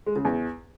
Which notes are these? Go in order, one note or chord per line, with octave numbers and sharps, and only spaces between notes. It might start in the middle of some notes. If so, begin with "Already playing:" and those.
G#3
C#3
E2